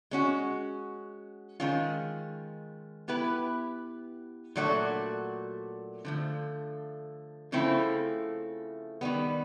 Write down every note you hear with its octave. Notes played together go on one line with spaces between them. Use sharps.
G#3 C#4 F#4
D#3 G#3 C#4 F4
B3 E4 G4 B4
A#2 F#3 A3 D4 F#4
D3 F3 A3
C#3 F3 A3 C4 E4
D#3 G3 B3